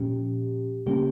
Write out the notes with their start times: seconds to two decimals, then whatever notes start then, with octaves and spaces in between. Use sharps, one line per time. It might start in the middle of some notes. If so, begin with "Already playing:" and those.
Already playing: A#2 F3 C#4 G4
0.86 C#3 G3 A#3 C#4 G4